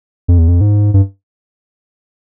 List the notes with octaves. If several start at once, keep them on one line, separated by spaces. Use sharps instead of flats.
F2
E2
F2
G#2
G2